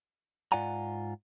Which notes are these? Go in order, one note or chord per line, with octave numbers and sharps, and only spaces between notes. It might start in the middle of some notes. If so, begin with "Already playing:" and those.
G#2 F4 D5 F#5 G#5 A#5